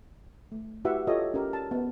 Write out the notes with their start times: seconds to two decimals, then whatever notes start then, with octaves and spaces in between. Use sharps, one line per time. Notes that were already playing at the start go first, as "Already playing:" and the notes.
0.52 A3
0.85 E4 F#4 G4 B4 E5 F#5
1.07 F4 G4 A4 C#5 D#5 E5
1.34 C#4 G4 A#4
1.53 A5
1.71 B3